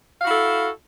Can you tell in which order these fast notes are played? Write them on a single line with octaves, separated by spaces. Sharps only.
F5 F#4 E4 A4